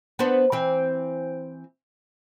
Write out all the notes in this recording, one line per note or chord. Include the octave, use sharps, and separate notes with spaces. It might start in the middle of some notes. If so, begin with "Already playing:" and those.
B3 D4 C5
E3 C4